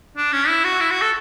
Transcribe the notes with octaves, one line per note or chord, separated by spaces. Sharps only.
D4
C#4
E4
F#4
E4
F#4
A4